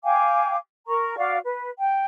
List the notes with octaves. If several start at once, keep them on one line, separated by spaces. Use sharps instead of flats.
F5 G5 G#5 D6
A#4 A#5 C#6
F#4 D5 F5
B4
G5